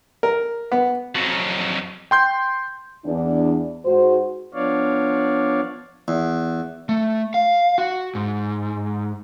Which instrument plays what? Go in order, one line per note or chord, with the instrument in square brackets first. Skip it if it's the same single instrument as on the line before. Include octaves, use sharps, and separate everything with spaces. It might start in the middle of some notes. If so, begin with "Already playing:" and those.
[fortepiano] A#4
B3
[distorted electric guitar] F2 F#3
[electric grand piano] G5 C6 G6
[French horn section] E2 D4
G#2 F#4 C5
[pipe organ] F3 B3 D4 C#5 D5 F5
[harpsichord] E2
[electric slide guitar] A3
F5
F#4
G#2